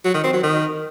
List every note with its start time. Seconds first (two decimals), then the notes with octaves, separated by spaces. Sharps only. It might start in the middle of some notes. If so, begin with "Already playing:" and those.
0.05 F#3
0.14 D#3
0.24 C4
0.33 F#3
0.43 D#3